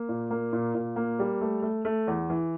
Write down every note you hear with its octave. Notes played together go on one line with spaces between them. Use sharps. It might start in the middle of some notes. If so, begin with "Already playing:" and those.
Already playing: A#3
A#2
A#3
A#2
A#2
A#3
G3
A3
A3
A3
E2
E3